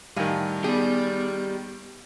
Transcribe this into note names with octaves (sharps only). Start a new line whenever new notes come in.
A2 D#3 G3 F5 G#5
B3 G4 G#4 D5